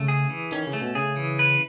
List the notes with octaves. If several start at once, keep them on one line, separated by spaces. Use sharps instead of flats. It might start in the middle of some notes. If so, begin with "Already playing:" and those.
Already playing: C#3 A3
G#4
E3
D#3 C#4
C#3
A3
B2
C#3 G#4
E3
B4